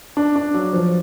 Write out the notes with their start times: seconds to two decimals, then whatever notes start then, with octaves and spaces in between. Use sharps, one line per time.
0.17 D4
0.36 D4
0.54 F#3
0.73 F3